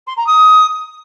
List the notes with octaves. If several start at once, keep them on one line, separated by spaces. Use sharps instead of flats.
C6
A#5
D#6